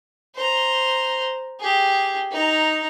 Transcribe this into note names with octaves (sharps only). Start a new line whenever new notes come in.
C5 A#5
G4 G#4
D#4 A#5